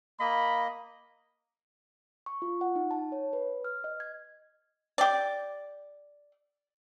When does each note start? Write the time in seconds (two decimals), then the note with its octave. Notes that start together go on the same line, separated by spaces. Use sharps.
0.20 A#3 D#5 B5
2.26 C#6
2.42 F4
2.61 F#5
2.76 D#4
2.91 A5
3.12 C#5
3.33 B4
3.64 F6
3.84 D#5
4.00 G#6
4.98 G4 D5